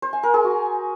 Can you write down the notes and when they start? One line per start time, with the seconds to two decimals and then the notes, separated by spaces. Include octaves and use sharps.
0.02 C5
0.13 G#5
0.23 A#4
0.34 G#4
0.44 F#4